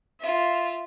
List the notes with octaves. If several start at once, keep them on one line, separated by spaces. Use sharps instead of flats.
F4 E5